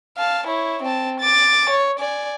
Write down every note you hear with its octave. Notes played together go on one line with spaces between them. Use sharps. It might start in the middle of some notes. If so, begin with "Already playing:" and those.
F5 A5
E4 C#5
C4 A5
D6 A6
C#5
D5 G#5